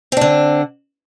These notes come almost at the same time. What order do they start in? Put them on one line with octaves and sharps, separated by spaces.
C4 D4 D3